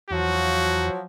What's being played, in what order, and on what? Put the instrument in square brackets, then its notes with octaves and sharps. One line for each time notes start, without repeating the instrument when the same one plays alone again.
[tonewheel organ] E2 [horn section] F3 F#3 [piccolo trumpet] F#4